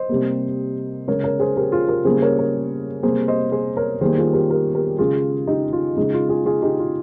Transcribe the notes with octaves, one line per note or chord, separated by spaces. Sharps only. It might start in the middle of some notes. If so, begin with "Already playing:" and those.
Already playing: C5 D#5
C3 G3 A#3
C#3 G#3 A#4 C#5
A#4 C#5
G#4 C5
G4 A#4
F4 G#4
G4 A#4
C#3 G3 A#3 G#4 C5
A#4 C#5
A#4 C#5
C3 G3 A#3 G#4 C5
C5 D#5
G#4 C5
A#4 C#5
D#3 G3 A#3 G#4 C5
F4 G#4
G4 A#4
G4 A#4
G4 A#4
C#3 G#3 F4 G#4
D#4 G4
F4
C#3 G#3 D#4
F4
F4 G#4
F4 G#4
D#4 G4
F4